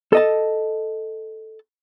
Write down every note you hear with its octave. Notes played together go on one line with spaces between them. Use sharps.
A4 D#5 A5